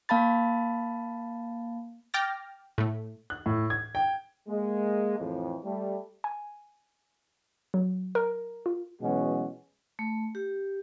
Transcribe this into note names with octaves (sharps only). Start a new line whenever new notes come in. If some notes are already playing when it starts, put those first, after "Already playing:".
A#3 F5 A5 B5 A6
G5 D6 F6 A6 A#6
A2 A3
F#6
A2
G#6
G5
G#3 A#3
F2 A2 E3
G3 A3
G#5
F#3
A#4
F4
B2 E3 F#3 G#3 C#4 F#4
A3
G4